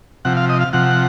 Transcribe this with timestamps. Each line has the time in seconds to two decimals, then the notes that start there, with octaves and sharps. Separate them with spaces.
0.25 C3 F3 F#5
0.37 F5
0.49 D#5
0.61 F5
0.73 C3 F3 F#5